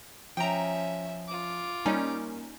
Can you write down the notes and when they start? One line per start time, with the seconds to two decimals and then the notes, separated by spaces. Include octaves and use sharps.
0.37 F3 C#4 E5 G5 A#5
1.27 F4 D6
1.86 G3 A#3 C#4 D#4